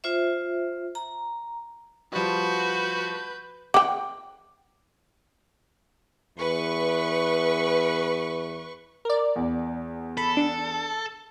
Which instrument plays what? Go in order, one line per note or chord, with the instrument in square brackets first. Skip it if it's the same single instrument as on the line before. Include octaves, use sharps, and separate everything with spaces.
[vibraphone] F4 C5 E5
A#5
[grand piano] F3 G3 [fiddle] F#4 [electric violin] B4 G6
[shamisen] F#5 G5 [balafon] D6
[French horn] E2 [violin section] B4 C#6
[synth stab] A#4 D5
[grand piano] E2
[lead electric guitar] A4 [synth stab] B5
[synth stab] D4